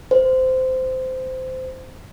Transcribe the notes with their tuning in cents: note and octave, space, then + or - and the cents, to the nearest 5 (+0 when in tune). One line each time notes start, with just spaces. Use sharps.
C5 -15